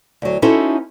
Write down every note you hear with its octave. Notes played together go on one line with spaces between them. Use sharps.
D2 F#3
C#4 D#4 E4 F#4 A4 C5